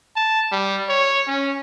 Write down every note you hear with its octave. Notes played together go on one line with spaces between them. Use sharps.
A5
G3
C#5
C#4